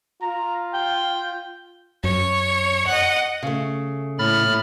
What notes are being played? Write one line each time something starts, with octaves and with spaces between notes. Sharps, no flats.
F4 A#5
G5
F#2 C#5
D#5 F#5
C#3 A3
A2 B5 F6 A6